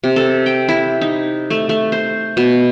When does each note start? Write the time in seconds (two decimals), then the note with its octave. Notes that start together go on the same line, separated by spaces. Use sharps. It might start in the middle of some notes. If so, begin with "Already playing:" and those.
0.04 C3
0.16 A4
0.46 G5
0.69 E4
1.01 D#4
1.50 A3
1.69 A3
1.92 C5
2.37 B2